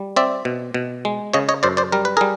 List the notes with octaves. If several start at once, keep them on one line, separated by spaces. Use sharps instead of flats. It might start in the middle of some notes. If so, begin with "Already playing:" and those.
Already playing: G3
C4 D5 E5
B2
B2
G#3
C#3 C#5 D#5
C#5 D#5
F#2 C5 D5
C5 D5
G3 A#4
B4
G3 G#4 A#4